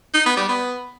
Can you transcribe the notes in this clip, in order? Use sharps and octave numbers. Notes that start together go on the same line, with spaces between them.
D#4
B3
G3
B3